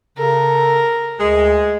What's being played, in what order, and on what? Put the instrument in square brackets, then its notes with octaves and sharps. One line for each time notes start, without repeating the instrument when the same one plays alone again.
[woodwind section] C#3 A4 [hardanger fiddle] A#4
[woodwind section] D2 [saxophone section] G#3